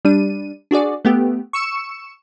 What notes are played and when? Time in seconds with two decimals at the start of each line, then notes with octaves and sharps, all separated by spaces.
0.05 G3 D4 D#7
0.71 D4 F#4 G#4 D5
1.05 A3 B3 G4
1.53 C#6 E6 C#7 E7